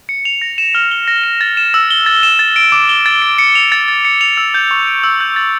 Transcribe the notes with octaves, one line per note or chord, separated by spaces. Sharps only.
C#7
F7
A#6
E7
F6
G7
A#6
E7
A6
E7
E6
G7
A6
E7
A6
D7
D6
G7
A6
D7
C#7
F7
A6
A6
C#7
F7
E6
G6
C#6
D7
E6
G6
A6